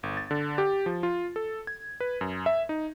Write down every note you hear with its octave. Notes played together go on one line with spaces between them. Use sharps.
G1
A6
D3
G4
F3
F4
A4
G#6
B4
F#2
E5
D#4